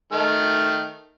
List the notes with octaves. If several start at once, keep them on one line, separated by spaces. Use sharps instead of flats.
D#3 A3 F6